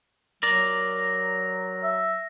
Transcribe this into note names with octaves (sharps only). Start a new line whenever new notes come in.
F#3 A#4 D5 A#6
E5